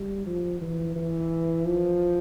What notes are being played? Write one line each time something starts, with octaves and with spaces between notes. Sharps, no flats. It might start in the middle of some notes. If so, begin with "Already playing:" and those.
Already playing: G3
F3
E3
E3
F3